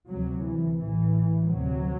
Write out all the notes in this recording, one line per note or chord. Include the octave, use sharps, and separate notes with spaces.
D2 C3 F#3
E3
A1 A2 E3
D2 C3 F#3